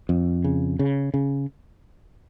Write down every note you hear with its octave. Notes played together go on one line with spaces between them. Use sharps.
F2
C#3
C#3
C#3